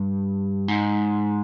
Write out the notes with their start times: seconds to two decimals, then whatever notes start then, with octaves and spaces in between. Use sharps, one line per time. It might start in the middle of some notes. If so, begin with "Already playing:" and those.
Already playing: G2
0.68 G#2